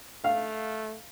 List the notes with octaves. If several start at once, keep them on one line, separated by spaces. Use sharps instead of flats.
A3 F5